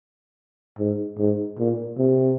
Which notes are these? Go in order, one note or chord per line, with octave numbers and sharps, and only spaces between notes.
G#2
G#2
A#2
C3